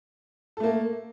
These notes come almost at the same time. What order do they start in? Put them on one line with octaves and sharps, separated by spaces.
A4 A3 A#3